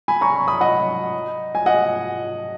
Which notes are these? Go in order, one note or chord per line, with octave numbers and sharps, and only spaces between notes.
G#5 B5
A#5 C#6
B5 D#6
D#5 F#5
G#5
D#5 F#5